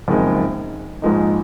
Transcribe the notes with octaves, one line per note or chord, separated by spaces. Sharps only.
F#1 F2 D#3 G#3 D#4
A#1 G#2 F3 G#3 D#4